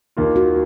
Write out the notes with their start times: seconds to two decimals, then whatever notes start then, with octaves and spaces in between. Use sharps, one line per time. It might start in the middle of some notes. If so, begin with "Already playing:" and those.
0.17 D#2 D#3 A#3 F4
0.36 F#4